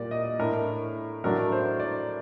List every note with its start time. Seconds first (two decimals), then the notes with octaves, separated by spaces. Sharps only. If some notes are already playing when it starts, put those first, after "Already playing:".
Already playing: A#2 G3 A#3 D5
0.11 D#5
0.39 A2 A3 D4 A#4
1.24 A2 F#3 A3 D4 A#4
1.52 C5
1.80 D5